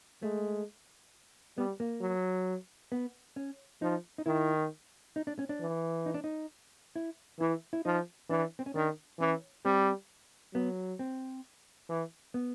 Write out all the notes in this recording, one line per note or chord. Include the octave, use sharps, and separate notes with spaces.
G#3 A3
G3 B3
A#3
F#3
B3
C#4
F3 D#4
D#4
D#3 E4
D#4
D4
C#4
D4
E3
D#4
D4
D#4
E4
E3 E4
E4
F3 D#4
E3 D4
C4
C#4
D#3 D4
E3 C#4
G3 C4
F#3 B3
C4
E3
B3